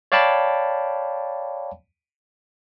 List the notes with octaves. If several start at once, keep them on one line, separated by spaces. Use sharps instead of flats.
C#5 D5 F5 G5 A5 B5